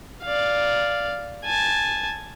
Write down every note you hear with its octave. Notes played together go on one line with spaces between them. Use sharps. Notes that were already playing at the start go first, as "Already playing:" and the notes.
D5 F5
G#5 A5